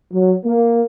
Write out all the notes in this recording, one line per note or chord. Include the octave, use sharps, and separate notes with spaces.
F#3
A#3